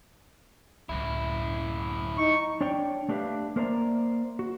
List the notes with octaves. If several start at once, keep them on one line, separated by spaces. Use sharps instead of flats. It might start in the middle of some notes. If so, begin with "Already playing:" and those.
C#2 F#2 A2 E4
D#4 C#6
D4 C#5 D5 G5
A3 D4 G4 B4 E5 F5
A#3 A#4 C5 D5 E5 A#5
F#4